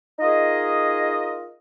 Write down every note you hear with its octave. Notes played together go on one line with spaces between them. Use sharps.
D#4 F4 G#4 A#4 D#5